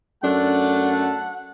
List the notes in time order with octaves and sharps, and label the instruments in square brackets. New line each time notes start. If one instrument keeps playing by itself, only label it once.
[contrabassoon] F#2 [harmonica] A3 A5 [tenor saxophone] D4 [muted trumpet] F#5